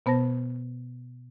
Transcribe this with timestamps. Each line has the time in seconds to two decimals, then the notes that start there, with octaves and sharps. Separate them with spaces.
0.06 B2 B3 C5 A5 A#6